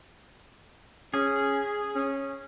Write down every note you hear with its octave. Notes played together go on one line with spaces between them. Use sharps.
C#4 G#4
C#4